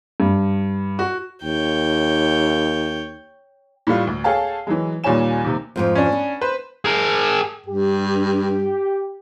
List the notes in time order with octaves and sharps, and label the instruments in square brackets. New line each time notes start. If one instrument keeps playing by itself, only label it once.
[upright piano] G2
F#4
[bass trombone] D#2 [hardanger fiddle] C#5 G5
[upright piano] A2 G3 A3 F4
D2
G#4 A4 C#5 F5 G5 A5
E3 F#3 G#3
D#2 A#2 G3 C#5 G#5 E7
D#2 C3
[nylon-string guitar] F2 G#2 F3
[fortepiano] C#4 D4
[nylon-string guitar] B3
[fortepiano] B4 C5
[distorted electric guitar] G#4 A#4
[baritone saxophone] G2 [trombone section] G4